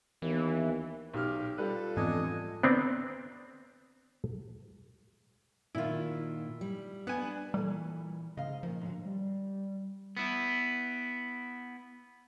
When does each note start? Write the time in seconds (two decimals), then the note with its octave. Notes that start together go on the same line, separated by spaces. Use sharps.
0.22 D#2 E3 B3
1.14 B1 G4 F6
1.58 G3 F4 A4 B4
1.97 F2 G#2 E3 F3 B3 D4 D#5 G#5
2.63 B3 C4 D4
5.75 A#2 D#3 E4 F4
6.61 G3
7.07 B3 D4 G#5
7.54 A#2 E3 G3 A4
8.37 G#2 C#3 D#5 F5
8.63 A#2 D#3 F3
8.82 G#2 D3 F#3
9.05 G3
10.17 B3 E4